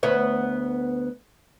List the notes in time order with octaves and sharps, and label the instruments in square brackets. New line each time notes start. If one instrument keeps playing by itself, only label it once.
[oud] D2 B3 C#5